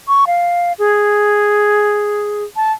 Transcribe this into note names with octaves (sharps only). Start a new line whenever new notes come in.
C#6
F5
G#4
A5